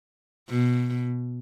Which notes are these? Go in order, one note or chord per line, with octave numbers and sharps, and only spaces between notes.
B2